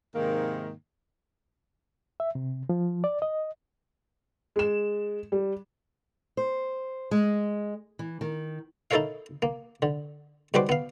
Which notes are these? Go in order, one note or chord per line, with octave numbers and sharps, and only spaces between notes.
G#2 C3 D#3 A#3
E5
C3
F3
D5
D#5
G#3 E7
G3
C5
G#3
E3
D#3
D#4 E4 A4 A#4 C#5 F5
A#3
D3
G#2 G3 F#4 B4 C5 D6
B3 F5